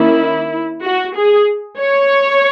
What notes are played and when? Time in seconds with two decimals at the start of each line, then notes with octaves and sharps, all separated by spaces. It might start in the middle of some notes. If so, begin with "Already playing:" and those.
Already playing: D#3 A#3 C#4 E4
0.84 F#4
1.16 G#4
1.80 C#5